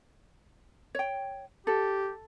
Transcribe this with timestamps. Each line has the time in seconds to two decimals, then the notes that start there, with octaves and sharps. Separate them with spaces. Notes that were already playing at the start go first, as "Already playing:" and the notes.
0.95 C#5 G5
1.67 G4 A4